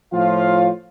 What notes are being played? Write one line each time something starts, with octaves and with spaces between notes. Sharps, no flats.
A2 F3 F4 C#5 F5